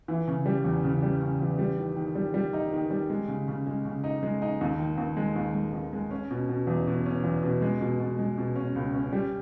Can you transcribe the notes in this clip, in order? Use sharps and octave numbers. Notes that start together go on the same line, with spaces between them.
E3
C#3
G3
E2
C#3
G3
C#3
E2
G3
D#3
D#3
G3
G3
D#4
D#3
G3
G#3
C#3
C#3
G#3
C#3
D#4
G#3
D#4
D#2
D#3
D#2
G#3
D#2
G#3
D#2
G#3
C#4
B2
B2
E2
B2
C#4
E2
B2
G#3
B2
B2
G#3
B2
C#4
C#2
C#4
G3